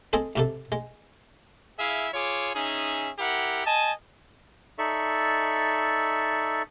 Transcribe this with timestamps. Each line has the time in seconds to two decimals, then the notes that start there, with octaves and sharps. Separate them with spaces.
0.13 G#3 C4 G#4 A4
0.36 G#2 C3 A4
0.72 G#3
1.78 E4 G#4 E5 F5
2.14 F4 G#4 C#5 D6
2.55 C#4 D#4 G#4 E5
3.19 E4 G4 A#4 F#5
3.66 D#5 G#5 A5
4.78 D#4 A4 D5 E5 C#6